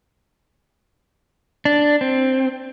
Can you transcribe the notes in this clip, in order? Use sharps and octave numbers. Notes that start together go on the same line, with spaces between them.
D4
C4